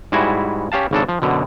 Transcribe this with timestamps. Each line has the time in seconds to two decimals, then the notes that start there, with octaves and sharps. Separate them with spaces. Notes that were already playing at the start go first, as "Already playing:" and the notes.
0.12 G#2 G3 E4 F#4 E5 G#5
0.72 C#4 G4 F5 A5
0.91 G#1 C#3 D4 A4
1.09 F3
1.22 F#2 B2 D3